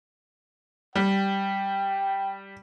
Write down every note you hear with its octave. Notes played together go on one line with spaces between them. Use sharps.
G3 G5